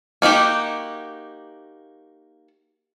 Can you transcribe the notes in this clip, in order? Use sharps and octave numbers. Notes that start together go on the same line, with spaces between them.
A#3 D#4 F#4 G4